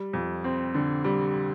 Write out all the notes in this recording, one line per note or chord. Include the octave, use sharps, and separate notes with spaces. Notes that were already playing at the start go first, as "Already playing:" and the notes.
Already playing: G3
F2
C4
D3
G3